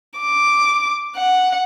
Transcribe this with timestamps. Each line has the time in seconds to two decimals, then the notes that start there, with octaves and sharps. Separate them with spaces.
0.20 D6
1.16 F#5